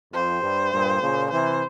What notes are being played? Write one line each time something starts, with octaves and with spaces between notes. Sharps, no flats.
F2 C5
G2
G2 A#2
A#2 C#3
C3 E3 C5